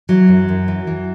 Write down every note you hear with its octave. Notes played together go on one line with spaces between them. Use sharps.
E3 F#3
F#2
F#2
E3
E3